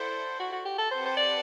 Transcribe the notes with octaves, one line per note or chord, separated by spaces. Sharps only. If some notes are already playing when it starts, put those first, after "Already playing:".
Already playing: E4 A4 C5 D5 F#5
F#4
F#4
G4
A4
C4 G4 B4 C5 F#5 A5
C5
D5